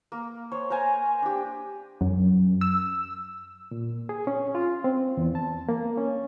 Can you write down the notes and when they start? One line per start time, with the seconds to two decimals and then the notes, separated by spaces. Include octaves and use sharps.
0.12 A#3
0.52 C5 C#5
0.70 A#4 C5 G#5 A#5
1.23 D4 G4
2.01 F#2
2.61 E6
3.71 A#2
4.09 G#4
4.27 C#4
4.55 F4
4.84 C4
5.17 E2
5.35 A5
5.69 A#3
5.97 C#4